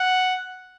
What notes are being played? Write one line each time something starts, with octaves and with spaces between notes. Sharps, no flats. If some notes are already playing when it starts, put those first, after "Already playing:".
Already playing: F#5